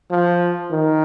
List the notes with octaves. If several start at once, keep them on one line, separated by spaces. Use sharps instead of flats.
F3
D#3